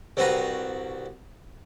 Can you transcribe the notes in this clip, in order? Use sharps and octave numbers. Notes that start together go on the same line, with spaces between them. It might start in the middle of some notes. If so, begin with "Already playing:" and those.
C2 C4 F#4 B4 A#5